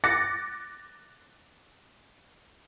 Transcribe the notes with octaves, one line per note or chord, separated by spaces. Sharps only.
D6 F#6 A6 A#6 C#7